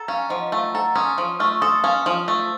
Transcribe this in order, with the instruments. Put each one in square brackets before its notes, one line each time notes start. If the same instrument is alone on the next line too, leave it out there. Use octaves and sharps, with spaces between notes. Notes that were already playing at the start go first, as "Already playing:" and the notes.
Already playing: [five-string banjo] A4 [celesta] F#5 A#5
[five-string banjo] C#4 [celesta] F5
[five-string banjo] F3 [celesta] D#5 F#5
[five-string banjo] A3 [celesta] F5 A5
[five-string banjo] A4 [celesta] F#5 A#5
[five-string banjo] C#4 [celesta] C6 D#6
[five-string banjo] F3
[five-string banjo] A3 [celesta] C#6 F6
[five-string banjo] A4 [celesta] C6 D#6
[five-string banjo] C#4 [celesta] F5 A5
[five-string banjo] F3
A3